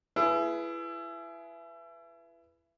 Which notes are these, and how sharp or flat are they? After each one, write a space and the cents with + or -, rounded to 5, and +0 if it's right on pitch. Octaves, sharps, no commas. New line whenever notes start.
E4 +30 G#4 +25 B4 +0